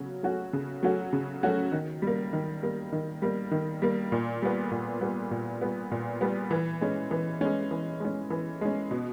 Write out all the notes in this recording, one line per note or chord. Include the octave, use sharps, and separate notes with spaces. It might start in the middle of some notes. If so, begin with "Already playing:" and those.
Already playing: C#3 F#3 C#4 F#4
F#3 A3 C#4 F#4
C#3
F#3 A3 C#4 F#4
C#3
F#3 A3 C#4 F#4
D#3
G3 A#3
D#3
G3 A#3
D#3
G3 A#3
D#3
G3 A#3
A#2
G3 B3
A#2
G3 B3
A#2
G3 B3
A#2
G3 B3
E3
G#3 C#4
E3
G#3 C#4
E3
G#3 C#4
E3
G#3 C#4
B2